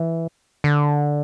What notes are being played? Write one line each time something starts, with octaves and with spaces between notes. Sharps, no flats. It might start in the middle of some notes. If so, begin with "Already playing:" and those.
Already playing: E3
D3